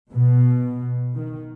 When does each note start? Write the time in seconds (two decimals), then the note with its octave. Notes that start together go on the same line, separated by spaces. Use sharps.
0.12 B2
1.15 D#3